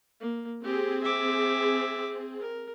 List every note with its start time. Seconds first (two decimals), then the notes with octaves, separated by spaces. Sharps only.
0.20 A#3
0.64 C4 G4 G#4
1.04 E5 D6
2.40 A#4